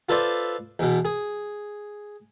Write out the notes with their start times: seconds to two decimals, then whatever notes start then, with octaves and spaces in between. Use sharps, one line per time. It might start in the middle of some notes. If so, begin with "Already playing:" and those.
0.09 F4 A4 B4 C5 D5 E5
0.79 E2 B2
1.05 G#4